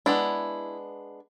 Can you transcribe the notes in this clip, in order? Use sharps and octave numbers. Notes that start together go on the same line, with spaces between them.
G#3 B3 D4 E4